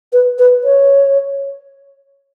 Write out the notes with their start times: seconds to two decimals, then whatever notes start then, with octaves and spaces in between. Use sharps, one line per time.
0.13 B4
0.39 B4
0.64 C#5